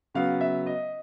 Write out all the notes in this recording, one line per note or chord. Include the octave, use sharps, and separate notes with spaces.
C#3 F#3 B3 F5
E5
D#5